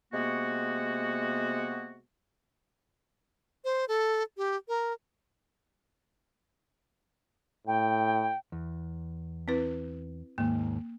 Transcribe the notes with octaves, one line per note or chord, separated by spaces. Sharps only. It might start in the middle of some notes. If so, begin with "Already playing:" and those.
C3 G#3 A#3 B3 F#4
C5
A4
G4
A#4
A2 G5
E2
C4 E4 B4
D#2 G#2 A#3